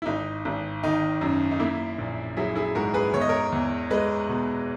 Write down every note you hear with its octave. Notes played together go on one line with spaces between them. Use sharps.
E4
G#1 D#4
G#1
D#3 D#4
F#2
D#4
A#3 E4
A#1
F#3 E4 G#4
E4 G#4
G#2 F#4 A#4
G#4 B4
E2 C#5
D#5
A#4 C#5
E2
G#3 B4 D#5
B2